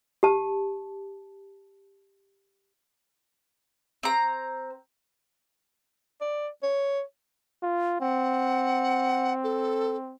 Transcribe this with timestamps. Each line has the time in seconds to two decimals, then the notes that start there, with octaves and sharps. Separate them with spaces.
0.23 G4 A5
4.03 C4 A#5
6.21 D5
6.63 C#5
7.63 F4
8.01 C4 F#5
9.44 A4